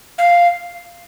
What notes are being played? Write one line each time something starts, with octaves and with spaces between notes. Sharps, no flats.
F5